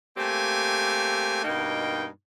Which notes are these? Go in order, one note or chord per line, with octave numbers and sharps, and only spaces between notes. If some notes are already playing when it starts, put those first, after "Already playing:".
A3 A#3 C4 G4 G#5
G2 B2 A#3 D#4 G5